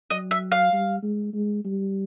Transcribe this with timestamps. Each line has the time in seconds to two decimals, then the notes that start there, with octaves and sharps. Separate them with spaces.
0.10 F#3 D#5
0.31 E5
0.52 F5
0.73 G3
1.03 G#3
1.33 G#3
1.65 G3